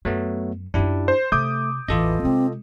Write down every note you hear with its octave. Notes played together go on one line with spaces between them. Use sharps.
F#2 F#3 A3 B3
F#2 D4 E4 F4 G4
C5
C3 A3 D6 D#6 G6
A1 E2 E3 F4 A4 D#5
C3 G#3 C4